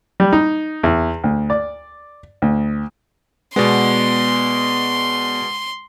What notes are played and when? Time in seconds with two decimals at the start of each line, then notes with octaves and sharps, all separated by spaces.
0.20 G3
0.33 D#4
0.83 E2
1.24 D2
1.50 D5
2.42 D2
3.56 B2 G#3 B3 B4 D5 C6